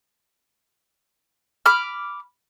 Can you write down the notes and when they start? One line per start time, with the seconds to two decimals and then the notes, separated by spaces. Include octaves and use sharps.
1.66 B5 D6 F6